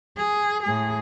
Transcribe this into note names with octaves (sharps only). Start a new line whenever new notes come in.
G#4
A2 G#4